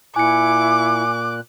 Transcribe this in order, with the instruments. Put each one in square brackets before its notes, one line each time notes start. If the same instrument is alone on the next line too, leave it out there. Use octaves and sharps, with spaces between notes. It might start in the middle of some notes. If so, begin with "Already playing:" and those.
[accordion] A#2 F#6 [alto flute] E4 [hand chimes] G#5 C#7 [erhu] D6